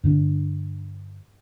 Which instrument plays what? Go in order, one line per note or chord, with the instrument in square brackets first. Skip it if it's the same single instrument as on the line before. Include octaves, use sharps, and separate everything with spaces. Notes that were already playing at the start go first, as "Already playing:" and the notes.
[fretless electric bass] G2 D3 D4